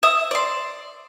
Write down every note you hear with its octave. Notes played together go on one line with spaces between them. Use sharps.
E5 D#6
D5 C6